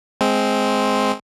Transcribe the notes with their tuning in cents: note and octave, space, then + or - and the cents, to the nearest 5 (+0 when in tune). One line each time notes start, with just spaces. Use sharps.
G#3 +15 C4 +0